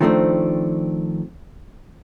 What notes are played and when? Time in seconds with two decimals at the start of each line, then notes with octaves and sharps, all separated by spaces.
0.01 D#3 F3 A3 C4 D4